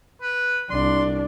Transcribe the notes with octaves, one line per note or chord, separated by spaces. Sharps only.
B4
C2 D4 C6